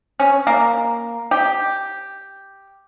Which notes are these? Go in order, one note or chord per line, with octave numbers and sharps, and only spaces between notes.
C#4
A#3
G4